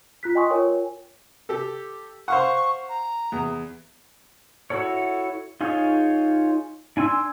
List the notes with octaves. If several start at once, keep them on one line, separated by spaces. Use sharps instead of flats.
F4 F#6 B6
D#5 G5 G#5 C6 C#6 D#6
F4 A#4 C#5 G5 G#5
G4 A4
C5 F5 F#5 C#6
A#5
E2
E4 F#4 A4 C#5
D#4 F4 G#4 C#5
D4 G#5 C6 E6